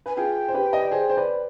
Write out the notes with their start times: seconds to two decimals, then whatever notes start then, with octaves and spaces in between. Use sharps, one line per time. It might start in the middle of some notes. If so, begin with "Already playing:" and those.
0.06 B4 G#5
0.17 F4 G#4 G5
0.48 C5
0.54 G4 B4
0.73 D#5
0.82 D5
0.91 G#4 C5
1.09 C5
1.17 B4 D5